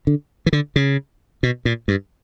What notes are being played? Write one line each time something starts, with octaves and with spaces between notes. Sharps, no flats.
D3
E3
D3
C#3
B2
A#2
G2